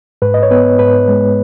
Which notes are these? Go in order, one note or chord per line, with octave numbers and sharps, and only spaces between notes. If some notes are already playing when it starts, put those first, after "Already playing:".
G#2 B4
D#5
C#5
B3 B4
G#2 B4
G#3